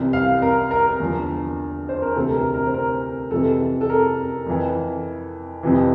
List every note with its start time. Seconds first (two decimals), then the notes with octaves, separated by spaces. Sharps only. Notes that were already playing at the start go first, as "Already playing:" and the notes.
Already playing: C2 C3 E3
0.13 F5
0.42 A#4
0.71 A#4
0.86 A#4
1.00 E2 D3 F3
1.89 C5
2.02 A#4
2.15 D2 C3 E3 A4
2.35 A#4
2.54 A#4
2.66 C5
2.74 A#4
3.31 F2 C3 E3 A4
3.81 A4
3.90 A#4
4.47 F2 E3
5.63 F2 C3 E3